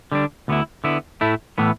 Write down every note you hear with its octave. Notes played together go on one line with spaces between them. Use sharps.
D3 G3 D4
D2 D3 B3 E4
D3 B3 E4
A2 A3 E4
A2 E3 B3